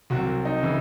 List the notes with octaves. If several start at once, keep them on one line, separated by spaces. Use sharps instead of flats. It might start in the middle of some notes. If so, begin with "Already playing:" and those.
C2 C3 F#3 F#4
D#4
C#3 E3